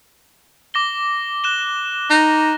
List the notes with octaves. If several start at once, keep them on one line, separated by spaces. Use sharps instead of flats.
D6 A#6 G7
F#6 E7 G7
D#4 A#6